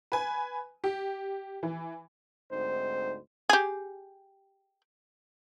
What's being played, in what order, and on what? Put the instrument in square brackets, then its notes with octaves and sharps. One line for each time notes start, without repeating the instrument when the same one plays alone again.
[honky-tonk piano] B4 G#5
G4
E3
[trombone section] D2 G#2 C4 D#4 C5
[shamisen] G4 G#4